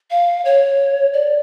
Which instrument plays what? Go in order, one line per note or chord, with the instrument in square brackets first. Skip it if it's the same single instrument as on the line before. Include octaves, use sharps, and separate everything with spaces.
[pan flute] F5
C#5
D5